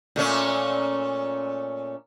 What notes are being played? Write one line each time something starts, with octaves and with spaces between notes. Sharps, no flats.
A#2 A3 C#4